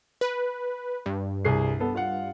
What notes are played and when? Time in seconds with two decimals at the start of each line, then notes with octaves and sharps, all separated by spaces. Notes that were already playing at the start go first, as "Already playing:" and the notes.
0.21 B4
1.06 G2
1.45 C2 G#4 C7
1.80 B3 A4
1.95 F4 F5 F#5